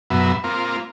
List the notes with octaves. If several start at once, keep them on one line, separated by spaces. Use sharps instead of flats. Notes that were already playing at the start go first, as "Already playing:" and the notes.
F#2 B2 F#3 B3 E5
A#3 C4 F4